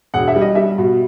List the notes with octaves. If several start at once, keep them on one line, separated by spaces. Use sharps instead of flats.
E1 F#5
E5
G3
D#5
G3 E5
B2